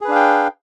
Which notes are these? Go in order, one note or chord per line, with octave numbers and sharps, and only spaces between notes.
D4 G#4 B4 F5 G5